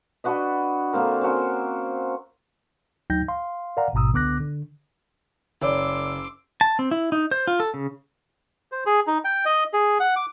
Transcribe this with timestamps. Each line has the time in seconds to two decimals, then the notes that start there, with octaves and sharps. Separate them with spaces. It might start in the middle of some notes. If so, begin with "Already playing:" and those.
0.24 D4 F#4 B4 D#5
0.93 D3 A#3 C4 A#4
1.21 C4 C#4 F#4 A#4
3.10 D2 F#3 D#4 G5 G6 A#6
3.28 F5 C6
3.77 A#4 D5 F5 F#5 A#5
3.93 A1 G#2 B2 A#5 D#6 E6
4.13 C#2 D3 B3 D6 F#6 A#6
4.40 D3
5.62 F#1 A#4 C#5 D5 C6 D6 E6
6.61 A5
6.79 C4
6.91 E4
7.12 D#4
7.31 C5
7.47 F4
7.60 A4
7.74 C#3
8.72 C5
8.86 G#4
9.07 D#4
9.24 G5
9.45 D#5
9.73 G#4
10.00 F#5
10.16 D6